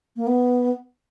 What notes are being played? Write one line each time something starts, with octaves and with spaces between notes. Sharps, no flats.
A#3
B3